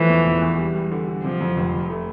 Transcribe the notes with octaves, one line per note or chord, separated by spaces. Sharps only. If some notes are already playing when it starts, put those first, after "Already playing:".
Already playing: E3 F3 A3
E2
E1
E2
G3
G3
D3
D3
C3 F3
F2
F1
F1
A3